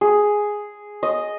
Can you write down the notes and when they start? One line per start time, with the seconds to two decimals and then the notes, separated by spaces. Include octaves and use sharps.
0.01 G#4
1.03 D#5